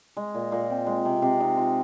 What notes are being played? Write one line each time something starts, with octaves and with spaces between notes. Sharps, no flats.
G#3
A#2
A#2
C4
G#3
C3
C3
D#4
F4